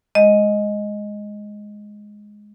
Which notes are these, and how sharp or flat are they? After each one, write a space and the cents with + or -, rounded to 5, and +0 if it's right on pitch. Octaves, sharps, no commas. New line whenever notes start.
G#3 +5 D#5 +0